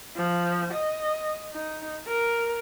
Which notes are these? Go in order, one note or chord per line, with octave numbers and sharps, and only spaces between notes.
F3
D#5
D#4
A#4